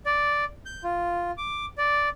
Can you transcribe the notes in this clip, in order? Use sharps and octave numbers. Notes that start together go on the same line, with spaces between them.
D5
G6
F4
D6
D5